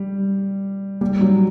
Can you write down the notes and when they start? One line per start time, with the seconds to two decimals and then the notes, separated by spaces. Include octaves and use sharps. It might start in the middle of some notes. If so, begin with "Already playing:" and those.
Already playing: G3
1.01 G3
1.21 F#3